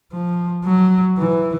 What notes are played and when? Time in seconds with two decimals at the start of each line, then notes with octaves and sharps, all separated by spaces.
0.12 F3
0.65 F#3
1.18 E3